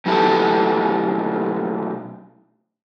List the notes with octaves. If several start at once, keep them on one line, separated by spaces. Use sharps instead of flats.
B2 F#3 A3 E4 G4 A4